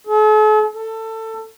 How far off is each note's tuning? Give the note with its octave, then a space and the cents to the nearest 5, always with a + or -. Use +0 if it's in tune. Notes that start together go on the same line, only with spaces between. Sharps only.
A4 -45
A4 +20